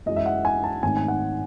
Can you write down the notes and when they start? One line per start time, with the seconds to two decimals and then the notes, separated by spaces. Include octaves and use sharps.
0.06 F#2 E3 G#3 D#5
0.16 E5
0.26 F#5
0.45 G#5
0.64 A5
0.83 G#1 G#2 D#3 A3 C#4 G#5
0.97 G#5
1.08 F#5